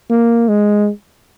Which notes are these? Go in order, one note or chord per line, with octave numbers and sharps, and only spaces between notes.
A#3
G#3